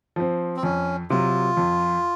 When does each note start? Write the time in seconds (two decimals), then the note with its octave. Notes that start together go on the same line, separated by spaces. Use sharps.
0.16 F3 C4
0.57 C4
0.63 F2 C#4
1.10 C3 F#3 F4
1.57 F2